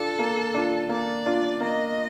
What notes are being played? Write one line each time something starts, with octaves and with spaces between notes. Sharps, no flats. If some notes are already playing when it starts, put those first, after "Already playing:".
Already playing: D4 F4 A4
A#3
D4 F4
A#3 D5
D4 F4
A#3 D#5